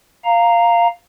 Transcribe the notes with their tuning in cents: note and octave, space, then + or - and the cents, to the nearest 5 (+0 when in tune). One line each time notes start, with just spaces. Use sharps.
F5 +0 A#5 -5